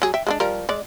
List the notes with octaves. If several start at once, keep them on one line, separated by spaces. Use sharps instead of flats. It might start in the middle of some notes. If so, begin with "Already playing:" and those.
F#3 G#4
E5 G5
G#3 A#3 D4
F3 G3 A#4
G#3 D5